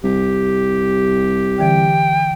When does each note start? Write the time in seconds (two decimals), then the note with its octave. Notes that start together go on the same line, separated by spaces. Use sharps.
0.04 C2 G4
1.59 D3 E3 G5